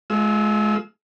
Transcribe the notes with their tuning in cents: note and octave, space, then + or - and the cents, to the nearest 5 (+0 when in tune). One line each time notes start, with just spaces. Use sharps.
G#3 +30 F4 +0 E6 -20